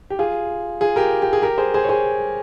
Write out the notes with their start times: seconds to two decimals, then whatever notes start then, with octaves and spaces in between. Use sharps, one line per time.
0.10 G4
0.19 F4 G#4
0.81 F4 G#4
0.96 G4 A#4
1.22 G4
1.33 G#4
1.42 G4 A#4
1.58 G#4 C5
1.74 G#4 C5
1.84 C#5
1.89 G#4 C5